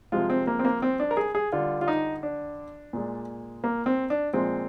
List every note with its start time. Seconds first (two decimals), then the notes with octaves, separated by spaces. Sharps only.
0.12 C3 F3 G#3 F4
0.30 C4
0.47 A#3
0.59 C4
0.65 A#3
0.82 C4
1.00 D4
1.11 A#4
1.17 G#4
1.35 G#4
1.52 D3 G3 F4
1.81 F4
1.88 D#4
2.23 D4
2.93 A#2 G#3
3.64 A#3
3.86 C4
4.10 D4
4.33 A#2 F3 G#3 C4